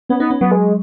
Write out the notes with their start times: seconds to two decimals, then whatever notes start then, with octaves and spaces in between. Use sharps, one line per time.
0.09 B3 C#4
0.20 B3 D#4
0.31 C#4
0.41 F#3 B3
0.51 G#3